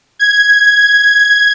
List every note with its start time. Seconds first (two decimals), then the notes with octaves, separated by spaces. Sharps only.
0.19 G#6